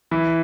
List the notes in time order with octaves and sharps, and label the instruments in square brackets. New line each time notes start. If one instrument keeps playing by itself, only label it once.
[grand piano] E3 E4